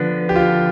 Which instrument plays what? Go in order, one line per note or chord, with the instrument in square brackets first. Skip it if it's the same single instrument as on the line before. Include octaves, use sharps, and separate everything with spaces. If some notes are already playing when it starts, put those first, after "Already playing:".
Already playing: [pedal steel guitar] D3 F3 B3 D4 [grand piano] B4
[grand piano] G4
F4